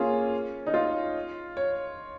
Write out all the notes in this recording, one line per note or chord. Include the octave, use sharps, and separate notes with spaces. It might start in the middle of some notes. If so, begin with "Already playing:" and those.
Already playing: A#3 C#4 F4 G#4
D#4
F4
C#5